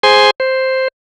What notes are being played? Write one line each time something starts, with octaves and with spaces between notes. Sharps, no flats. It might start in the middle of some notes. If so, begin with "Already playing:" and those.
G#4 C5 G#5 C6
C5